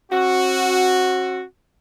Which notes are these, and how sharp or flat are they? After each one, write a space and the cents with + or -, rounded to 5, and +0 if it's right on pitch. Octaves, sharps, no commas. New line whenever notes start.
C4 +40 F#4 +0